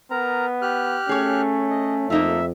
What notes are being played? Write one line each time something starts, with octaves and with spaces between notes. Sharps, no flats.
B3 A#4 A#5
G4 F6 F#6
A3 C#4 G#4 C#5
D#5
F2 A#3 D#4 F4 E5